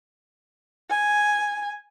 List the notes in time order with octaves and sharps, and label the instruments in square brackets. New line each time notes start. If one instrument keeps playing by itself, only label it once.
[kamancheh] G#5